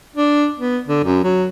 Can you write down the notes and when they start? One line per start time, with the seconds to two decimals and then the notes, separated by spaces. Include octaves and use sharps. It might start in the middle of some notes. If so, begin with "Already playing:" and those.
0.16 D4
0.59 B3
0.88 D3
1.04 F#2
1.24 F#3